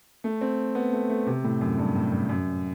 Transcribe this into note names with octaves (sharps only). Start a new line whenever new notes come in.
A3
C4
B3
A3
A3
C3
A2
F#2
G2
A2
G2
F#2